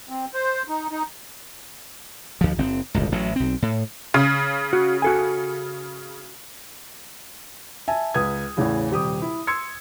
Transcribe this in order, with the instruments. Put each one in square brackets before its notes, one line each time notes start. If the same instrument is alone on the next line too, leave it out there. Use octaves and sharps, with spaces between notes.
[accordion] C4
C5
D#4
D#4
[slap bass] D2 F3
F#1 C4
D1 G1 C#2
A1 A2 F#3
B1 C4
A2
[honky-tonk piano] C#3
[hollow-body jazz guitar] F#4
F#4 A4 G#5
[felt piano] E5 G#5 A5
C#2 B4 D#6 G#6
E2 A2 C#3 E3
D#1 C3 G3 G4 D#6
E4
C6 E6 G#6 C#7